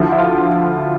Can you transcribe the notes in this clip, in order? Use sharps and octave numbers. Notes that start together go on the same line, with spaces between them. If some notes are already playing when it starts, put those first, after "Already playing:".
Already playing: D2 D3 F3 E4
E4
F4